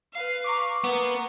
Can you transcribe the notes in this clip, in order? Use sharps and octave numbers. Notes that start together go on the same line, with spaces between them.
B4 F5
A#5 C#6 D6
A#3 B3